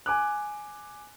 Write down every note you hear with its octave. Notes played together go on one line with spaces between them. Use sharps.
G#5 D6 F#6